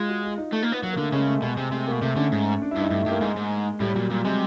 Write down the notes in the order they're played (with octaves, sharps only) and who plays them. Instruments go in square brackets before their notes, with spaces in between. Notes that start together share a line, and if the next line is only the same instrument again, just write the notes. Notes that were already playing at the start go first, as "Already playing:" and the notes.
Already playing: [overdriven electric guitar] G#3 [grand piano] F4
[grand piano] F#4
F4
D#4
[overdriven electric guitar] A3
A#3
B3
[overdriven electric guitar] F#3 [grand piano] A#3
[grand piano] A#3
[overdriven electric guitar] D3
[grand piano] A3
[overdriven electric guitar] C#3 [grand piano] G#3
[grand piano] A3
[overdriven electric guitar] B2 [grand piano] G#3
[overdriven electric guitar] C3 [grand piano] G#3
[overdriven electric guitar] C3 [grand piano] A3
[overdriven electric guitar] B2 [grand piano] A#3
[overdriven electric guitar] C3 [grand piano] A3
[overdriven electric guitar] D3 [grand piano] C#4
[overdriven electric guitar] G#2
[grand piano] D4
E4
[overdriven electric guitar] G2
[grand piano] D#4
[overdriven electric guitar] G2 [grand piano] A3
[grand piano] A3
[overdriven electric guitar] G2
[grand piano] A#3
[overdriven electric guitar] G#2 [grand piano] G#3
[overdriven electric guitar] G#2
[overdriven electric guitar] A2 [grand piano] G3
[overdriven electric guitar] A#2 [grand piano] F#3
[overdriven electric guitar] A#2 [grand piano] G3
[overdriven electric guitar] C3 [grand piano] G#3